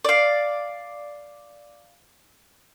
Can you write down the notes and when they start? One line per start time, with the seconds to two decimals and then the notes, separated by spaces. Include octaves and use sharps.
0.05 D5 F5